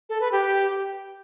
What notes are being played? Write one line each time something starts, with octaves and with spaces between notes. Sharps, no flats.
A4
B4
G4